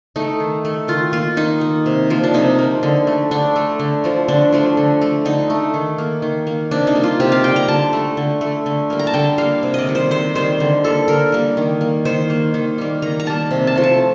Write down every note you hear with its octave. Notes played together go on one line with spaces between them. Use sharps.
A3 D#4
D#3
A3
D#3 F4
A#3 F4
D#3 D#4
A#3
C3
F3 A#3
D4
C3 D#4
F3 A#3
D3
A3
D3 D4
A3
D3
F3 A3
D3 D4
F3 A3 D4
D3
A3
D3 D#4
A3
D#3
A#3
D#3
A#3
C3 D4
D#4
G3 A#3
F4
C3 G4
F5
G3 A#3 G5
A#5
D3 A5
A3
D3
A3
D3
G3 A#3
A#5
A5
D3 G5
G3 A#3 F5
C3
D5 D#5
D#3 G3
C5
C3 C5
D#3 G3 C5
D3
G3 A#3 A4
D3 A#4
G3 A#3
D#3
A#3
D#3 C5
A#3
D#3
G3 A#3
D#3 A#5
A#5
G3 A#3 A5
C3
A5
F3 A3
A5